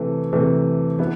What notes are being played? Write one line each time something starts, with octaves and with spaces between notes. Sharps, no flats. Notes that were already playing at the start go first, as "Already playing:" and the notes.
Already playing: C3 E3 A3
C3 E3 A3
E3 B3 E4